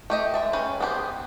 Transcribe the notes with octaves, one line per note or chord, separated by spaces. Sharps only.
A3 G4 D#5
G#3 E5 A5
C#4 G#4 B4 G5 G#5
B3 C4 D4 G4 G#4